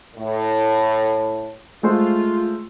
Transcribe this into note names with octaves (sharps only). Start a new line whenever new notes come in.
A2
G#3 A3 F4 C5